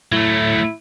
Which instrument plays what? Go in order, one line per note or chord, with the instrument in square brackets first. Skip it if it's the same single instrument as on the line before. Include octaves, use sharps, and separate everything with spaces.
[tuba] A2 [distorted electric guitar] F#3 A3 [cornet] E4